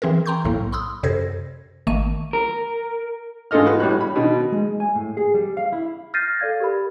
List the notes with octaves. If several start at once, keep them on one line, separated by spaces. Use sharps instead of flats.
E3 C4 G#4 A#4
G5 A#5 C6 C#6 G6
B1 A2 A#3
B5 C6 D#6 E6
F#2 C3 A4 C5 G#6 A#6
G#1 D#3 A3 A#3 C#6 D#7
A#4
G#2 F4 A4 D#5 F6
F#4 B4
A2 G3 C#5 F#6
B5
B2 D#3
G#3
G#5
A2
G#4
G3
F5
E4
F6 G6 A6 A#6 C7 D#7
A4 D5 F5 G#6
G4 A#4 B5